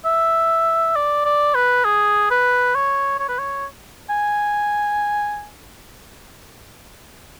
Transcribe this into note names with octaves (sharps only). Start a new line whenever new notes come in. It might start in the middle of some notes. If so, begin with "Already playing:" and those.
E5
D5
D5
B4
G#4
B4
C#5
C#5
B4
C#5
G#5